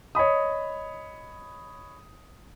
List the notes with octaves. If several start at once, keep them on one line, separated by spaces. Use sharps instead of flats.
C#5 D#5 B5 D#6